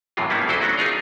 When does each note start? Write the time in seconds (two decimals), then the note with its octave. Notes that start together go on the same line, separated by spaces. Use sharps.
0.17 F#2 A2 C3 E3 F#3 F4
0.30 G3 A#3 B3 C#4 D#4 E4
0.48 D2 F#3 E4 A4 C5 D#5
0.61 F#3 A3 B3 C#4 D4 F#4
0.78 C#4 D#4 F4 G#4 A#4